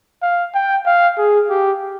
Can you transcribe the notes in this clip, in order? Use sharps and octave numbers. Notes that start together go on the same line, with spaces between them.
F5
G5
F5
G#4
G4